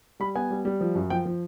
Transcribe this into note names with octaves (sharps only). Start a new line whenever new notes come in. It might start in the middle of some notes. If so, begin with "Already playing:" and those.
G3 B5
B3 G#5
G3
G3
F3
F#2
F3 G5
F3